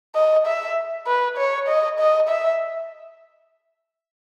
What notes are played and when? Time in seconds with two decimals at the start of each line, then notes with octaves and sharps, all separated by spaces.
0.15 D#5
0.46 E5
1.07 B4
1.37 C#5
1.68 D#5
1.99 D#5
2.28 E5